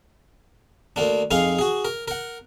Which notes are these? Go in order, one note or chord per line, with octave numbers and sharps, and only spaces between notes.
D2 A#3 D4
F2 D#4 G#4 F5 C6
F#4 G#4
A#4
A#4 F#5